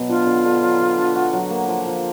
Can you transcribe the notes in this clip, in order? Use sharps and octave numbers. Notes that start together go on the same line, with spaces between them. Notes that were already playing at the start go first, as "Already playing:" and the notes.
Already playing: B2 F#3 B3
D4 F4
D3
D3
F#3
D3
D4
F#4
F#3
A#3
F3
F3